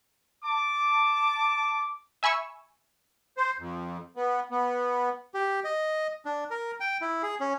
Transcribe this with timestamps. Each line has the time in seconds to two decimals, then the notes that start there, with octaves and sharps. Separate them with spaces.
0.44 A5 D6
2.23 E5 G#5 B5 C#6 E6
3.37 C5
3.59 F2
4.16 B3
4.51 B3
5.34 G4
5.64 D#5
6.25 D4
6.51 A#4
6.80 G5
7.01 E4
7.23 G#4
7.40 C#4